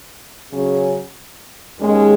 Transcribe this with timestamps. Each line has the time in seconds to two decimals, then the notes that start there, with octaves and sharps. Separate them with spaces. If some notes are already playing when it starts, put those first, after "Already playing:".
0.51 C#3 F#3 C#4 G#4 C#5
1.78 D#2 D#3 G#3 C#4